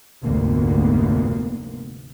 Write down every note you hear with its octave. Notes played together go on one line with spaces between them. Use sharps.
F1 D2 G#2 C3 A#3 B3